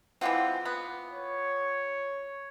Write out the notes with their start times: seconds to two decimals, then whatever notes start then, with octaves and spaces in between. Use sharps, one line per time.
0.21 E3 G#3 C4 F4 F#5 D6
0.65 B3
1.10 C#5